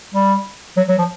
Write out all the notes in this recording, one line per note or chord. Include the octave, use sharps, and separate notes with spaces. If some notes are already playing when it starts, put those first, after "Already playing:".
G3
F#3
F#3
F3